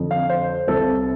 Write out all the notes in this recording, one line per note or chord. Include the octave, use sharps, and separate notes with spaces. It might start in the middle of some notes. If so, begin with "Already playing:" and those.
Already playing: F2 D3
F5
C5
C2 C3 A4